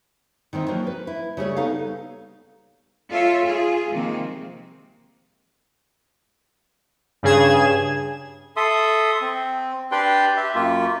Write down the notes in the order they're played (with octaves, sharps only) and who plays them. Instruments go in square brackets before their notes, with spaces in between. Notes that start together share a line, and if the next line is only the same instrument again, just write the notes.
[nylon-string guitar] D#3 E3 C4 C#4 D#4
F3 F#3 A#3
B4
E4
C#3 G3 A3 C#5
B3 D#4 A4 F5
[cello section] F4 A4 C#5 E5
F4 G#4
C3 D#3 F3 G#3 A#3 C4
[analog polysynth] G2 C#3 G#4 G#6 E7
[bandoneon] A4 E5 C6 D#6
C4
D4 G4 B4 D5 G5 C6
G4 E5
F#2 A#3 F4